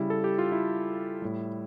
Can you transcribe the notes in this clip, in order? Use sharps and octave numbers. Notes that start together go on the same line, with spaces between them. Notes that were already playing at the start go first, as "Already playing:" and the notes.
Already playing: C#3 G3 E4
A4
G4
F4
E4
A2 G3